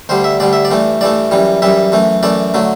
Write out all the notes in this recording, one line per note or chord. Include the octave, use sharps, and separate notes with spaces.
D2 D3 G3 C5
E5
D2 D3 G3 D5
E5
D5
G2 E3 A3
G2 E3 A3 D5
F#2 E3 G3
F#2 E3 G3 E5
F#2 E3 A3
F#2 E3 A3 D5
D3 F#3 A3